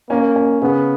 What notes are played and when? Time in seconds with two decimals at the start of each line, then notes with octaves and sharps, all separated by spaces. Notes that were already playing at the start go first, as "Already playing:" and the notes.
0.10 A#3 C#4
0.36 C#4
0.62 C#3 B3